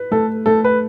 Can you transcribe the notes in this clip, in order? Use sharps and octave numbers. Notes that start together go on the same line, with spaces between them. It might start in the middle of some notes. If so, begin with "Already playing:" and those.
Already playing: B4
A3 A4
A3 A4
B4